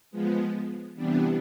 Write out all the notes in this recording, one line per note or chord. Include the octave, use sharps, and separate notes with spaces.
F3 G#3 B3
C3 E3 G3 B3 D4